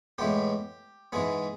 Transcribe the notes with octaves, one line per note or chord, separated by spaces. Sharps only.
A2 E3 G#3 B3 G4
G#2 E3 G#3 B3 G#4